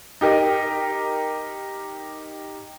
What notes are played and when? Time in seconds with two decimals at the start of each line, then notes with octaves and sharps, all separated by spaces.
0.21 D#4 G4 A#4 D#5